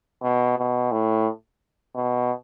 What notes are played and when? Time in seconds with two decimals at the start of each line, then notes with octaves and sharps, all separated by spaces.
0.22 B2
0.58 B2
0.92 A2
1.95 B2